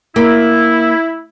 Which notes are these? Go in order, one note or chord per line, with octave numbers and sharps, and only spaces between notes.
A#3 E4